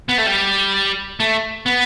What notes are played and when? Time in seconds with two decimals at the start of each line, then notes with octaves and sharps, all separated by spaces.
0.09 B3
0.18 A3
0.26 G3
1.20 A3
1.66 B3